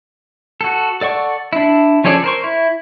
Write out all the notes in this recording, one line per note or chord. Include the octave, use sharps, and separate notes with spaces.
F#4 A4
A4 D5 F#5 C#6
D4 E4
F3 C#4 G#4 A4 D5
A#4 C5 C#6
E4